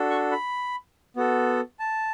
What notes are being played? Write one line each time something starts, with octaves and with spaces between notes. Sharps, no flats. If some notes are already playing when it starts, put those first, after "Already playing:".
Already playing: D4 F#4 A4
C#6
B5
B3 F#4 A4
A5